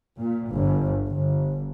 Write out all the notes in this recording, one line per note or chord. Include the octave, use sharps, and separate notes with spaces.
A#2
G1
G1